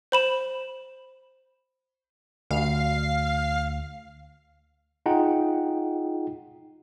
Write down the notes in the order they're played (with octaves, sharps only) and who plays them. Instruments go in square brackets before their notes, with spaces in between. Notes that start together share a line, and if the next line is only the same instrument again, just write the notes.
[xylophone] C5 B5 E7
[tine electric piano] D2 [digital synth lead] F5
[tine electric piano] D#4 F4 G#4 F#5 G5